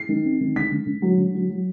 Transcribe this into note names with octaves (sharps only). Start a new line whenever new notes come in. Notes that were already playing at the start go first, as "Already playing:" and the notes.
Already playing: C7
D#3
C4
D#3
D3 B6
D3
D3
F#3
D3
F#3
F#3